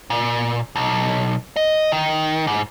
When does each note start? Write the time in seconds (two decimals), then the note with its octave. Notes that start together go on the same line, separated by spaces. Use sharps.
0.10 A#2
0.76 B1
1.56 D#5
1.92 D#3
2.47 G#2